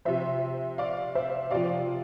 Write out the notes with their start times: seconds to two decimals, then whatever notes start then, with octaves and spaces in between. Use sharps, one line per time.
0.05 C3 F3 C5 E5
0.78 D5 F5
1.15 C5 E5
1.51 C3 F3 D5 F5